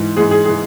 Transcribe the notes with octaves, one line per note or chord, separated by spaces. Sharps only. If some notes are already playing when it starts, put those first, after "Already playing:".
Already playing: G#2 E3
G#2 E3 G#4
G#4
E3 G#4